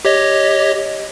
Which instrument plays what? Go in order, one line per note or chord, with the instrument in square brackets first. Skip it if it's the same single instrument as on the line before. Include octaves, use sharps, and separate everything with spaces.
[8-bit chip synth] G4 C#5 D#5